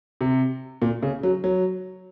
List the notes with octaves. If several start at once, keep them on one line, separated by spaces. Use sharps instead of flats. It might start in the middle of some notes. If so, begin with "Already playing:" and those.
C3
A#2
C#3
F#3
F#3